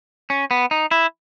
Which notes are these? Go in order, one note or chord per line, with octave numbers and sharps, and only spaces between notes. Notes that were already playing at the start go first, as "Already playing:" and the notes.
C#4
B3
D#4
E4